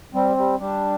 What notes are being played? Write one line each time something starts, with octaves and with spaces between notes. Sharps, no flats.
G3 C4
G3
G3 D4